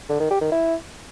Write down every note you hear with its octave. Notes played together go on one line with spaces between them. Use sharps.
D3
D#3
G4
D#3
E4